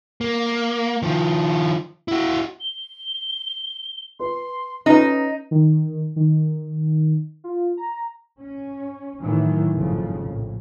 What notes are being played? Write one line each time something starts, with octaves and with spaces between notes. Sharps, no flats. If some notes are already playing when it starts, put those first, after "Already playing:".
A#3
D#3 F3
E4 F#4
G7
B4 C6
C#4 D#4 B4 D#5
D#3
D#3
F4
A#5
C#4
A2 D#3 E3 F#3
F#1 F2 G#2 C#3 F3
A#1 A2